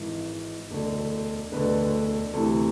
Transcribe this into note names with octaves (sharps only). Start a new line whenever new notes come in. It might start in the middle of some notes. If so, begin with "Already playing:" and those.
Already playing: G#1 G#2 E3
E1 D2 D3
E1 D2 D3 B4
D2 C3 E3 A4